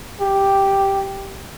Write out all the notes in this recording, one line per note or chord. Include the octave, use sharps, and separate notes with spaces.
G4